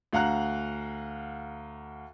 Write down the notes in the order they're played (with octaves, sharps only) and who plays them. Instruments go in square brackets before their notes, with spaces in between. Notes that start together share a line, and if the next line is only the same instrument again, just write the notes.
[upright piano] D2 F5 F#5 A#5 F#6